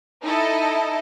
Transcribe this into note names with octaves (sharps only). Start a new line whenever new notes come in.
D#4 E4 A4 D#5